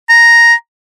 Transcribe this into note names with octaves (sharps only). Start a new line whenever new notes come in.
A#5